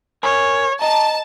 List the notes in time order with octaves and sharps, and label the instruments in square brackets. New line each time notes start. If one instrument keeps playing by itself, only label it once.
[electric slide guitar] A#4 G#5 [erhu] C#5
[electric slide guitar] D#5 [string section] A5 [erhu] A#5